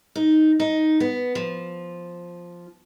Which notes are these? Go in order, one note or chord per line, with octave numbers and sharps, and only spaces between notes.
D#4
D#4
B3
F3